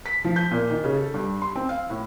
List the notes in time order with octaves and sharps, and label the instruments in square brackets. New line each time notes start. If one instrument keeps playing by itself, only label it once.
[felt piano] B6
F3
G6
A#2
D#3
C#3
A4
G2
C6
C4
F5
A2